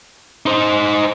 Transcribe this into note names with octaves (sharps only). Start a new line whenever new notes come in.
D#4 C5